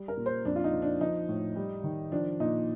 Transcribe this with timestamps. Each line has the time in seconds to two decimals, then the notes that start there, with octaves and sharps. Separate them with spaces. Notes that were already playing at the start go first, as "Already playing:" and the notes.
Already playing: G3
0.08 A#4
0.17 A#2
0.26 C5
0.45 F2 D4
0.56 F4
0.64 D#4
0.73 F3
0.82 D4
1.00 F3 D#4
1.29 A2
1.56 G3
1.84 D#3
2.12 F3 D4
2.40 A#2 D#4